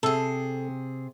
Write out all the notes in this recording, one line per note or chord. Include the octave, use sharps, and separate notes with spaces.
C3 G#4 A4